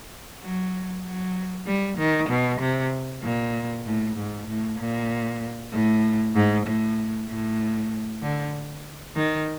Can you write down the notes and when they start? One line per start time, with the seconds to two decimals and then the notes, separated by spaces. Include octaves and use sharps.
0.42 F#3
1.04 F#3
1.66 G3
1.98 D#3
2.29 B2
2.60 C3
3.22 A#2
3.85 A2
4.16 G#2
4.47 A2
4.79 A#2
5.72 A2
6.35 G#2
6.66 A2
7.28 A2
8.22 D3
9.16 D#3